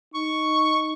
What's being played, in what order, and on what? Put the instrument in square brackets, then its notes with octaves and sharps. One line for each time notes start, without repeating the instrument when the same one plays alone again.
[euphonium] D#4 [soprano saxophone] C#6